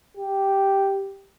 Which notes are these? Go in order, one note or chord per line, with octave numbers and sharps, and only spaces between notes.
G4